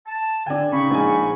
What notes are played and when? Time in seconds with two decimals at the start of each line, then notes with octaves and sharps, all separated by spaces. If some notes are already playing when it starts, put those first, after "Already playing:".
0.07 A5
0.46 D3 D4 G5 G#5
0.72 C#3 D#4 B5 C#6
0.91 A#1 G#3 G#5